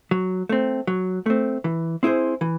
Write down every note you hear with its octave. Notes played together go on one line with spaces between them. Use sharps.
F#3
A3 C4
F#3
A3 C4
E3
C4 E4 G#4 C5
E3